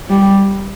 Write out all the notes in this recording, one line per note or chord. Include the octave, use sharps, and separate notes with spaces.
G3